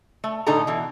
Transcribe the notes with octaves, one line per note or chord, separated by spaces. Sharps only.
A3
A2 D3 D#4 G#4 A4 A#5
B2 E3